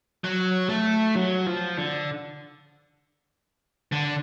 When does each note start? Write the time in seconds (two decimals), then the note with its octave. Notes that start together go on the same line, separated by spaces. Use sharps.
0.25 F#3
0.70 A3
1.15 F#3
1.46 F3
1.77 D3
3.92 D3